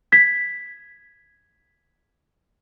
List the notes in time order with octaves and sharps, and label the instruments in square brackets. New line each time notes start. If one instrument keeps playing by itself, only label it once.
[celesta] G#6 B6